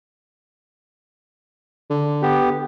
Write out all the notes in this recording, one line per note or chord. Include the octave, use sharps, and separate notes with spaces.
D3
B3 G4